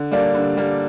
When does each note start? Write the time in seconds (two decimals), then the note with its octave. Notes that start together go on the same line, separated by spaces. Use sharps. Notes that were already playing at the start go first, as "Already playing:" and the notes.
Already playing: D3
0.12 G3 A#3 D4
0.35 D3
0.57 G3 A#3 D4